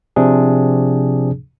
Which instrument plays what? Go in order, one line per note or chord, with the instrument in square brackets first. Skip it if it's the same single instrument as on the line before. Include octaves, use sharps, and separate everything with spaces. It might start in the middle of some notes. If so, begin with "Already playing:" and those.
[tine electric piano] C3 F3 D4 G#4